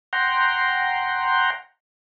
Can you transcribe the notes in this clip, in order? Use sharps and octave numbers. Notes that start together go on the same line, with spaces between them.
F#5 G5 A#5 C6